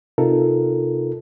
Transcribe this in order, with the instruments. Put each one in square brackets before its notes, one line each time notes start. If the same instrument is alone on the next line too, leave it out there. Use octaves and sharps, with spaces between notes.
[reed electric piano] C3 D#4 F4 A4 A#4